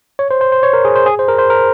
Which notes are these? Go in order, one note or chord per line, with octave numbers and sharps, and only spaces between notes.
C#5
C5
C5
C5
C#5
A#4
G#4
C5
G#4
C5
A#4
C5
A#4